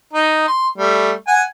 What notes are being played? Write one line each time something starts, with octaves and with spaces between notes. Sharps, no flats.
D#4
C6
G3 A3
F#5 G#5